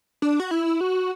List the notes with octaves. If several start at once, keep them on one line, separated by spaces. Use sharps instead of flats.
D4
F#4
E4
F#4